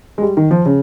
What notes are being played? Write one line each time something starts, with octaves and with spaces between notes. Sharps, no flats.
G#3
G3
D#3
F3
C#3